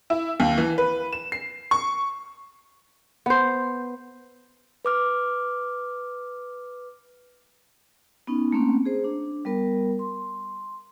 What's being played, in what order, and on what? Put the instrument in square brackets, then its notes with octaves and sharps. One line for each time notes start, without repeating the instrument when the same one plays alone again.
[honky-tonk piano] E4
D#2
E3
B4
E7
C7
C#6
[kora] B3 C5
[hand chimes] B4 D6 F6
[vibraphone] B3 C#4 D#4
A3 A#3 C4 C#4
G#4 C5
D4
G3 B3 A#4
C6